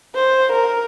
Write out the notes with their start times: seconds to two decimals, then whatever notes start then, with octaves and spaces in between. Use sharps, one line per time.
0.15 C5
0.52 A#4